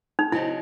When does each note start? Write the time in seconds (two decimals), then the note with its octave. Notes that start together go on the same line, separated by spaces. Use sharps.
0.19 D#4
0.32 C#3 F#3 C4 D#4 E4